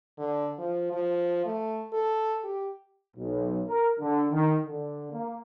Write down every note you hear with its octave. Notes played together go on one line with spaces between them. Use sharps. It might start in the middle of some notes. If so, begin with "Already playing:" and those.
D3
F3
F3
A3
A4
G4
B1
A#4
D3
D#3
D3
A#3